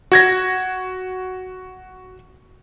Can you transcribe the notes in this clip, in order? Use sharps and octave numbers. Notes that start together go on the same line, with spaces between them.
F#4 G#6 A#6